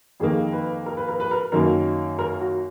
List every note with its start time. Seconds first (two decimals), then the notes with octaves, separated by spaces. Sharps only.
0.20 F2 D#3 A#3 G#4
0.52 B4
0.86 A#4
0.97 B4
1.08 A#4
1.20 B4
1.31 A#4
1.52 F#2 D#3 F#3 A#3 A#4
2.19 A#4
2.41 F#4